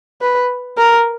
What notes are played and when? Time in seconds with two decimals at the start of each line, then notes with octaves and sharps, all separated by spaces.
0.21 B4
0.78 A#4